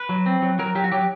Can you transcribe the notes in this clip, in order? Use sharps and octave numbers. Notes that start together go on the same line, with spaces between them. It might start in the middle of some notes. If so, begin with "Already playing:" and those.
Already playing: B4
F#3
C4
F#3
F#3 A#4
F#3 G4
F#4
F#3 G4